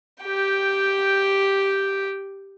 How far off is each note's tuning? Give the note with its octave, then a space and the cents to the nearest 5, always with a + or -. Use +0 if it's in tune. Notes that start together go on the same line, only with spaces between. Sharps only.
G4 -5 G5 +0